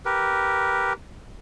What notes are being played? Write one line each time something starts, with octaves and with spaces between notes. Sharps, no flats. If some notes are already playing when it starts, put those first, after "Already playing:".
G4 A#4 B4